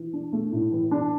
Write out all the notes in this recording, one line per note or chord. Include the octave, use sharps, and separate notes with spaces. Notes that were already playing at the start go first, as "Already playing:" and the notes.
Already playing: E3
D4
A3
A2
E3
D4